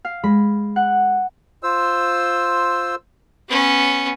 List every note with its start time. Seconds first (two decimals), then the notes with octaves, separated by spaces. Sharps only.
0.05 F5
0.24 G#3 B5
0.76 F#5
1.63 F4 C5 E6
3.48 B3 C#4